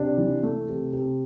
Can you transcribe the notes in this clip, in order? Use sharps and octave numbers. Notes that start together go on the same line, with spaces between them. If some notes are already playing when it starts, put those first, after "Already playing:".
Already playing: C3 D4
E3
A3
C3
C3